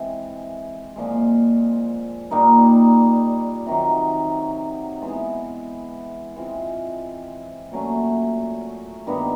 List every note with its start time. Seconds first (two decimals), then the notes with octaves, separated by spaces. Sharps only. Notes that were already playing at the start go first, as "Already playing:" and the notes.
Already playing: E3 G#3 C4
0.96 A#2 F3 G#3
2.31 A#2 G3 A#3 D#4
3.66 C3 D#3 F#3
5.01 E3 G#3 B3 E4
6.36 E3 G#3 C4 F4
7.72 A#2 F#3 A3 C#4
9.07 G2 D#3 G3 B3